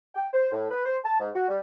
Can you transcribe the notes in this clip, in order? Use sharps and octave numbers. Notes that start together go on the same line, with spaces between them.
G5
C5
A2
B4
C5
A5
G#2
F#4
G3